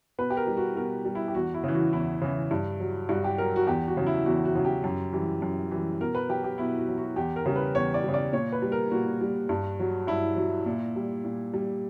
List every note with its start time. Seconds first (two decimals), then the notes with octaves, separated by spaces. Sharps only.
0.18 B2 B4
0.30 G4
0.37 A#4
0.47 G3
0.57 F#4
0.76 B2 A#4
1.05 G3
1.15 E4
1.28 G4
1.35 E2 F#4
1.54 E4
1.64 C#3 E3
1.73 F#4
1.93 E2 E4
2.22 C#3 E3
2.51 G2
2.80 F#3
3.09 G2 F#4
3.24 G4
3.38 F#3 A#4
3.56 F#4
3.67 E2 G4
3.87 F#4
3.97 C#3 F#3
4.06 E4
4.26 E2 F#4
4.45 F#4
4.55 C#3 F#3
4.65 G4
4.84 F#2
5.13 E3 G3
5.42 F#2
5.71 E3 G3
6.01 B2 A#4
6.15 B4
6.29 F#3 G4
6.44 G4
6.58 B2 E4
6.78 F#4
6.88 F#3
6.98 F#4
7.16 E2 G4
7.36 A#4
7.46 C#3 G3
7.56 B4
7.75 E2 C#5
7.94 D5
8.04 C#3 G3
8.14 D5
8.33 A#2 C#5
8.52 B4
8.62 G3
8.72 A#4
8.91 A#2 F#4
9.21 G3
9.49 G2
9.79 F#3
10.07 G2 E4
10.36 F#3
10.66 A#2
10.96 G3
11.25 A#2
11.54 G3